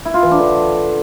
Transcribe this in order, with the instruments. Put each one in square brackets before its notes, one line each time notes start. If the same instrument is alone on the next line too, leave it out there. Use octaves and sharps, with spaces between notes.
[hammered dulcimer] E4
F4
E3
D4
D3